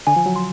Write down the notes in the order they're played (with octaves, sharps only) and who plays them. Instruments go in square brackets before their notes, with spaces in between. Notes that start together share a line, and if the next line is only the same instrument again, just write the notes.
[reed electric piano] D3 [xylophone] G#5
[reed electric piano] F3
F#3
[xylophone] C6